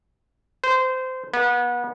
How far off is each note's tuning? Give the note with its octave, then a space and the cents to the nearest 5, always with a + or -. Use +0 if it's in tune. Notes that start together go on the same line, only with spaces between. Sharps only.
C5 -20
B3 -30